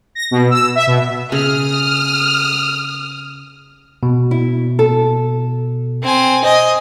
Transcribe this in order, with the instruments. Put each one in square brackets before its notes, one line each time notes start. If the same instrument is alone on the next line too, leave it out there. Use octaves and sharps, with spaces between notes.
[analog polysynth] A#6
B2
E6
E5
B2
[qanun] C#3 [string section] D#6 F6
[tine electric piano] B2
[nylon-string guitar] E4
A4
[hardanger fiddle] C4 G#5
[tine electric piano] C5 [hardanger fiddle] D#5 G#5